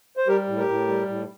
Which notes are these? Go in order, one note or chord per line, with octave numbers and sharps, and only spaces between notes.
C5
G3 G4 A#4
A2
G4 A#4
A2
G3
A2